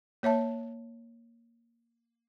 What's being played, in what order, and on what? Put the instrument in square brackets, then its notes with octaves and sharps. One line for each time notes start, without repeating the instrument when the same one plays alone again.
[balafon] A#3 C#5 E5 A5